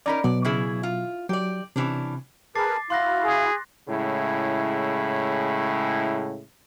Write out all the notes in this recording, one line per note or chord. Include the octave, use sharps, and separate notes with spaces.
C#4 D#4 A#4 D5 A#5 B5
B2 F#3 D5
C#3 E4 G#4
F4
F#3 G4 D5
C3 E3 C#4 D4
G#4 A#4 B4 A5 D6 A6 C7
E4 F#4 F5 C6 F#6 A#6
G#4
A2 C#3 G#3 E4